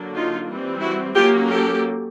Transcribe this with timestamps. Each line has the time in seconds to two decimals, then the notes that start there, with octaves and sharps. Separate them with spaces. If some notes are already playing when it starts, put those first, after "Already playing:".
Already playing: D3 F#3 A#3 D4
0.14 D#4 F4
0.48 E3 G3 C4
0.81 E4 F#4
1.15 F#3 A#3 C#4 F4 G4
1.49 G4 A4